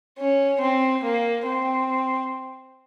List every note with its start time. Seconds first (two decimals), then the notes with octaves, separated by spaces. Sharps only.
0.18 C#4
0.61 C4
1.03 A#3
1.46 C4